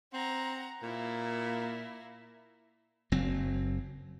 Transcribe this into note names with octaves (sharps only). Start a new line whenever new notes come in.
C4 F#5 A#5
A#2 A#3 E4
F#1 F#3 C4